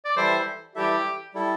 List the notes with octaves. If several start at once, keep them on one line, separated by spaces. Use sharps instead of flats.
D5
E3 G3 E4 A4 C5 E5
E3 G3 E4 G4 A4 E5
G3 E4 A4